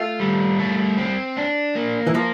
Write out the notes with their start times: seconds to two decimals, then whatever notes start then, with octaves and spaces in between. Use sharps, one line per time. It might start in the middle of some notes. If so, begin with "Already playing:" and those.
Already playing: A3 F4
0.20 G3
0.59 A3
0.98 C4
1.37 D4
1.75 A#3
2.07 E3
2.14 F3 A#3